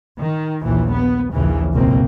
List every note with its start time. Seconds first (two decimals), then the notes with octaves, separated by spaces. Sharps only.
0.21 D#3
0.64 A#1 D#2 E3
0.92 B3
1.33 A#1 D#2 C#3 E3
1.72 F#1 C#2 B2 A#3 C4